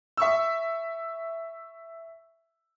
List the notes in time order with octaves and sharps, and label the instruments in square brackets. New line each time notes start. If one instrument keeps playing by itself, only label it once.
[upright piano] E5 C#6 E6